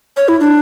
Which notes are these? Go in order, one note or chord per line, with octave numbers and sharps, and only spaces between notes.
C#5
E4
D4